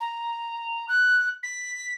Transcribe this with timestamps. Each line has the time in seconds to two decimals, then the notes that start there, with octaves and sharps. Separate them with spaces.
0.01 A#5
0.89 F#6
1.43 B6